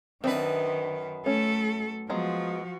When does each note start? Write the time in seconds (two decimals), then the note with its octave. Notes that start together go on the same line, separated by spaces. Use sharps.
0.24 F#2 D#3 C4 D4 B4
1.26 A3 C#4 A4
2.09 F3 F#3 G#3 B3 F#4